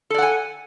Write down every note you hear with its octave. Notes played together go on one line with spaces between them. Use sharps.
A4 D5 F#5 G#5